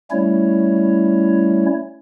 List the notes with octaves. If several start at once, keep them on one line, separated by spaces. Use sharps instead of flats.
G3 A3 C#4 E4 C#5